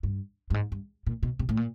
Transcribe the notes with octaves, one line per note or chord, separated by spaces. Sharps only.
G2
G2
G#2
G2
A#2
B2
C3
A2
A#2